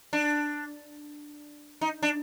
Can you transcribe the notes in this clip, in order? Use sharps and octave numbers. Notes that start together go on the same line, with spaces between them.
D4
D#4
D4